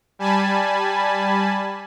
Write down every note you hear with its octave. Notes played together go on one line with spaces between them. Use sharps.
G3 G#5 A5 B5